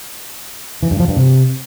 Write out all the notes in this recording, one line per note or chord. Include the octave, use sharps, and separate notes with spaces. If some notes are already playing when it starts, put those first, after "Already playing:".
E3
G2
F3
G2
C3